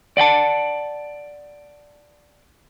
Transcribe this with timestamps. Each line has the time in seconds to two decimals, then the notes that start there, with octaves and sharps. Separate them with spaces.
0.17 D5 F#5 G5 A5